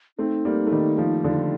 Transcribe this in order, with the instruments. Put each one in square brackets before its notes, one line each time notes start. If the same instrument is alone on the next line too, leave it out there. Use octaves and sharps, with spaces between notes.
[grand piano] A3 C4 [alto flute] D#4
[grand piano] G3 A#3
A3
D#3 G3
F3 A3
D3 F3